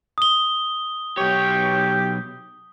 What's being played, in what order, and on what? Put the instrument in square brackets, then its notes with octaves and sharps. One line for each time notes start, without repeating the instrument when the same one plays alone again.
[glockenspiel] D#6 G7
[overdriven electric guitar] B1 C#5 [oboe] G4